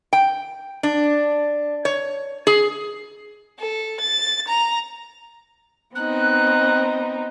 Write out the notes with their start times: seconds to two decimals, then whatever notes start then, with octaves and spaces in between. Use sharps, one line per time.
0.13 G5
0.83 D4
1.85 C#5
2.47 G#4
3.59 A4
4.01 A6
4.48 A#5
5.95 B3 C4 D#4 F#6